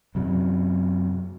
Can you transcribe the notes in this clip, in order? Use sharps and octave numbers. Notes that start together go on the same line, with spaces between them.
F#2 C3 F#3